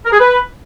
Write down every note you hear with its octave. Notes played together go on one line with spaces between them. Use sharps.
A#4
G#4
B4